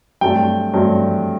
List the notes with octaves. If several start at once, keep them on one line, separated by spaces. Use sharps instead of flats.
G2 F#3 A3 C4 G5
G2 F#3 A3 C4